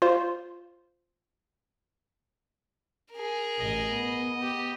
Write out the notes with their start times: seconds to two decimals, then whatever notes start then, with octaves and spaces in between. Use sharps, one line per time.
0.02 F4 C5
3.12 G#4 A#4
3.59 A1 D#5
3.92 B3
4.41 G4